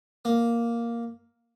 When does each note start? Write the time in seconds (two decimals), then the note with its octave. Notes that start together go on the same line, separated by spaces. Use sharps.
0.25 A#3